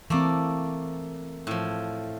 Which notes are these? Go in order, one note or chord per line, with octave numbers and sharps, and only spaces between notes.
E3 A3 A#3 C4 D5
A2 F3